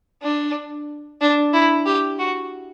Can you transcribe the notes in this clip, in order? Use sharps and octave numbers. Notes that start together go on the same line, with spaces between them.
D4
D4
E4
G4
F#4